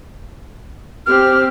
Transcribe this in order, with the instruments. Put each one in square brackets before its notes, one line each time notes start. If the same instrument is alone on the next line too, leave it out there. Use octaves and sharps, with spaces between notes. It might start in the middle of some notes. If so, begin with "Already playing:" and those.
[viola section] C4 G4 [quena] F6